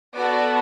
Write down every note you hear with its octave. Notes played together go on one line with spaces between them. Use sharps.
B3 F#4 A4 D5